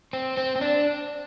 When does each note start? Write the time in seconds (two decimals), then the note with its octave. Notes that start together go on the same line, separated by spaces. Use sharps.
0.13 C4
0.37 C4
0.56 C4
0.61 D4